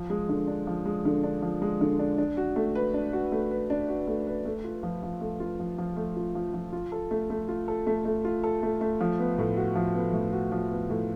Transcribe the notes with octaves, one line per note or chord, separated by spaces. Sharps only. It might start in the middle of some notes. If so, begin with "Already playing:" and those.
Already playing: F3
G#3
D3
D4
F3
G#3
D3
D4
F3
G#3
D3
D4
D4
F#4
A3
B4
D4
F#4
A3
B4
D4
F#4
A3
B4
A3
F4
F3
F3
A3
F4
F3
F3
A3
F4
F3
F3
F4
A4
A3
A3
F4
A4
A3
A3
F4
A4
A3
A3
F3
B3
A2
F#4
F3
B3
A2
F#4
F3
B3
A2